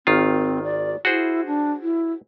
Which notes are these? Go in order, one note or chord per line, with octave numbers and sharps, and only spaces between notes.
G#1 D#3 C4 F4
D5
E4 F#4 G#4 C5
D4
E4